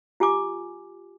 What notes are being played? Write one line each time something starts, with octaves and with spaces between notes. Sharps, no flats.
F4 G4 G#5 D6